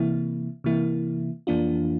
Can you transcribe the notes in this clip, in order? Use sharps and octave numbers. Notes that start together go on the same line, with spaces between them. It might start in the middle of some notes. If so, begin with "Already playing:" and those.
Already playing: C3 E3 A#3 E4
C3 E3 A#3 E4
F2 E3 A#3 D4 F4